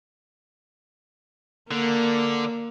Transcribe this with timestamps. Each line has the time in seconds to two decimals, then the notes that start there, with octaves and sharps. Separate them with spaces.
1.71 D3 A#3